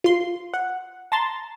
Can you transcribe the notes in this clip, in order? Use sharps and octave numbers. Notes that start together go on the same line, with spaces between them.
F4 C6
F#5
A5 A#5 C6 A6